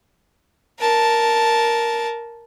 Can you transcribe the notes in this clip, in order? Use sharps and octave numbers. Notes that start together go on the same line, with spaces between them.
A#4 A5